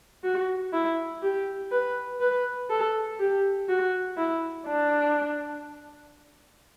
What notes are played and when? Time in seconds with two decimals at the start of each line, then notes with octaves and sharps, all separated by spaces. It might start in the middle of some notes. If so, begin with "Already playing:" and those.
0.24 F#4
0.73 E4
1.23 G4
1.71 B4
2.20 B4
2.70 A4
3.19 G4
3.69 F#4
4.17 E4
4.67 D4